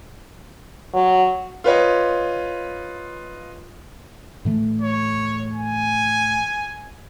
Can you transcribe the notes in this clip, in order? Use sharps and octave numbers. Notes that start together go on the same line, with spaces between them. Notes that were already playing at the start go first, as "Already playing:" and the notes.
F#3
F4 B4 C#5 D#5
A2 E3 A3
C#5
G#5